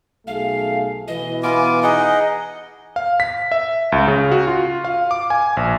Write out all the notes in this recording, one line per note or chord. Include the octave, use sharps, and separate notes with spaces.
B1 A3 G#4 F5
B2 E3 D#5
B3 F4 G#5 D6
D#4 G#4 D#5 F#5
F5
B6
E5
C#2
C#3
F#4
F4
F5
D6
G#5
A#1